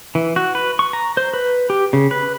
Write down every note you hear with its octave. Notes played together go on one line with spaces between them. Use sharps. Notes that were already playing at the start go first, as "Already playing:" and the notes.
E3
F#4
B4
C#6
A#5
C5
B4
G4
C#3
B4